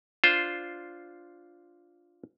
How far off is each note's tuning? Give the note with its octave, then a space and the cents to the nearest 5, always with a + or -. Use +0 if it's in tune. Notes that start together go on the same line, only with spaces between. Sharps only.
D4 -5 F4 +0 C5 +0